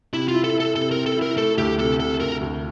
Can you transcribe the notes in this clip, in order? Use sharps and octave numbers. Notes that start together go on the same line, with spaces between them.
C3 E4
F4
E4
A4
E4
A4
C3 A4
C4 A#4
A4
E4
A#4
A3 A4
D2 G4
C3 A4
C3 A4
D2 A#4
D2